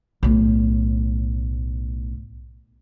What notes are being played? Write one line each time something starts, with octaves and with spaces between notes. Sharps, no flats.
B1 A2